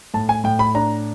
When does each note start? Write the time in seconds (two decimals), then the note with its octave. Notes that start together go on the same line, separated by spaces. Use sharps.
0.14 A2 A5
0.29 G#5
0.44 A2 G5
0.59 B5
0.75 D4 A#5